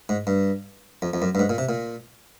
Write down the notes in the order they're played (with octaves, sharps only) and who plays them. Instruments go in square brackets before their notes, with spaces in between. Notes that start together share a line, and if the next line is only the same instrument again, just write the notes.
[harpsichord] G#2
G2
F2
F2
F#2
G2
G#2
A#2
C3
A#2